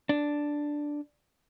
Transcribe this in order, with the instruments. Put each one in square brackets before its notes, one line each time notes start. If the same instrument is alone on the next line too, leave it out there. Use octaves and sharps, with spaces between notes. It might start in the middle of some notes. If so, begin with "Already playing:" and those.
[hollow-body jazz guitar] D4